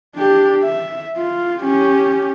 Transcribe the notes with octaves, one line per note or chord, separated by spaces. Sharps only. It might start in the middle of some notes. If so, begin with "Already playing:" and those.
D4 G4
E5
F4
C#4 G4